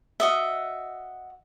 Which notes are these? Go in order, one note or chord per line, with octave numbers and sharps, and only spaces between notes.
F#4 D#5 E5